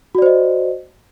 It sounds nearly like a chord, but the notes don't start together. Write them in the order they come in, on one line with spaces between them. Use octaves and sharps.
F#4 D5 C5 D#5